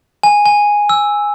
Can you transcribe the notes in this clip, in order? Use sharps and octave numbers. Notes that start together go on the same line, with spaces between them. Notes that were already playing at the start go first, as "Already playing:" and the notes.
G#5
G#5
E6